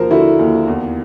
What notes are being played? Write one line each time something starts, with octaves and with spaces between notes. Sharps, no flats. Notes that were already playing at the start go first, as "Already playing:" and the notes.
Already playing: D#2 F3 A#4 C5
D3 E4 F#4
D#2
E2